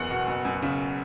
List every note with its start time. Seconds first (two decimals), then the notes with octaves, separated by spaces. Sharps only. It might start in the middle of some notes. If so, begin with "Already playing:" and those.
Already playing: F#1 E2 F#5
0.10 B2
0.27 F#1
0.45 F#2
0.62 C#3